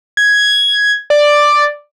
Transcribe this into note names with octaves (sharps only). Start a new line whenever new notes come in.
G#6
D5